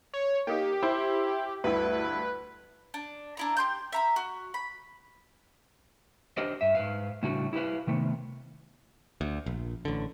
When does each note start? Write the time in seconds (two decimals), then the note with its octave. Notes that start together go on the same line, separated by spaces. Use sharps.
0.14 C#5
0.47 A#3 D#4 G4
0.83 E4 C5
1.64 D2 G2 E4 B4
2.94 D4
3.37 D4 E4 A#5
3.57 G4 C6 G6
3.92 E5 A#5 B5
4.16 F#4
4.54 B5
6.37 D4 G4 A#4 C5 D#5
6.61 G2 E5
6.75 G#2 B4 F5
7.23 A2 C#3 G3 A3 D4 F#4
7.53 E4 G4 A4 B4 F5
7.87 C3 D#3 A3 B3
9.21 D2
9.46 A#1
9.85 A1 D3